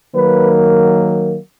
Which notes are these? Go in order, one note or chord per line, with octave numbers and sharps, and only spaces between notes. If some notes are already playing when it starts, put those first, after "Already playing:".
D#3 F#3 A#3 B4